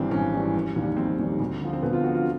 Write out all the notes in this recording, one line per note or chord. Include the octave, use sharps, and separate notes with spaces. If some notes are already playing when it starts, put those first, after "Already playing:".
Already playing: G#1 G2 E3 G3 C4
G#1 C#4
G2 E3 G3
F1
D#2 D#3 G3
F1 C4
D#2 D#3 G3
D2
D3 F3
C4
D2 B3
F4
D3 F3 F#4
F4